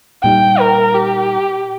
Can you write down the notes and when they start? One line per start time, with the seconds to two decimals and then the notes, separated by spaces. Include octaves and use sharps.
0.23 A#2 G3 D#4 G5
0.59 A#4
0.94 G4